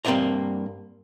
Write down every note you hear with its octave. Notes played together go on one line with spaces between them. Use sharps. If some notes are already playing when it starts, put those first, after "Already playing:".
G2 A#3 C4 C5 D5 A#5